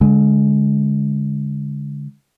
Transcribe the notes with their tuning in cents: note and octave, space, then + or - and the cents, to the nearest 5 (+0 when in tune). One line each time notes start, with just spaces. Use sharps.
D3 -30 G#3 +0